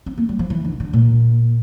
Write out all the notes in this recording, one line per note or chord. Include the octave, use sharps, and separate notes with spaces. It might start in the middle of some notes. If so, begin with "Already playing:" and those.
C4
A#3
G3
F3
E3
D3
D3
A#2